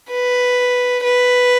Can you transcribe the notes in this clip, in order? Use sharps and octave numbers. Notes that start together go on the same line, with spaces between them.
B4
B4